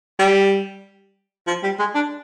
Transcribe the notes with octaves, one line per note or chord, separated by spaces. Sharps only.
G3
F3
G3
G#3
D4